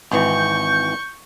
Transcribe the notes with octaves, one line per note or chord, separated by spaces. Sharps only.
G#1 E3 C#6 G6